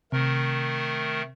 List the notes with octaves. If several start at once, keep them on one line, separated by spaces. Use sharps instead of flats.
C3 D#3 A3 A#4